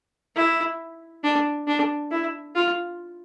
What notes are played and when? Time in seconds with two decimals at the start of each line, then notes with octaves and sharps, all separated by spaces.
0.35 E4
1.23 D4
1.67 D4
2.11 E4
2.55 F4